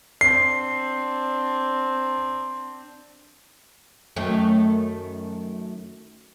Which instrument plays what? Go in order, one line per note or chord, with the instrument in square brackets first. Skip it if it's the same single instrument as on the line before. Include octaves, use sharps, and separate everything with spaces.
[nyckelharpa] C4 D4 [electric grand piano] C7
[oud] F#2 D#3 A3